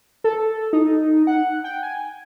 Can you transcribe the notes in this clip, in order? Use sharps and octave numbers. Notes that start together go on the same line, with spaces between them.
A4
D#4
F#5
G5
G#5